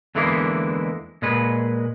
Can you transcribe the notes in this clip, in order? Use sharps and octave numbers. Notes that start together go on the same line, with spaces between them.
E2 D3 E3 G#3 A#3 E4
A#2 G#3 B4